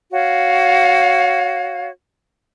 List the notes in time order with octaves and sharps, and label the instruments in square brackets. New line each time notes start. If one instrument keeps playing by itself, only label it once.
[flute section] F#4 C#5 F5